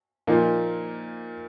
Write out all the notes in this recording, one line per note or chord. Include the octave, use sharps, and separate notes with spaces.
A#2 F3 A#3 D#4